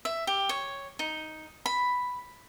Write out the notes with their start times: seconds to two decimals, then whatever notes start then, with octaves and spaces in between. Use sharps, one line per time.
0.05 E5
0.27 G4
0.49 C#5
0.99 D#4
1.66 B5